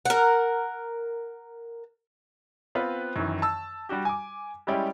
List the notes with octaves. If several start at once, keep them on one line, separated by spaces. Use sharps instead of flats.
A#4 F#5
B3 C4 F4 B4
F#2 D#3 E3
A5 E6
G3 D4 F#4 G4
G#5 D6
G3 G#3 C#4 E4 G4 D5